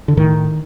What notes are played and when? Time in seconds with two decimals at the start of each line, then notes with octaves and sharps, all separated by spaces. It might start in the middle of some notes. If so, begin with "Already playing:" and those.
0.08 D3
0.17 A2 D#3